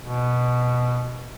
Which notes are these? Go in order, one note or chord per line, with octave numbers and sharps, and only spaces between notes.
B2